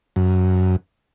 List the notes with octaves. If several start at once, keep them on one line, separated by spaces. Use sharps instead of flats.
F#2